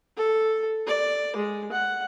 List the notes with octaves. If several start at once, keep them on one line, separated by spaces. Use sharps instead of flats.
A4
D5
G#3
F#5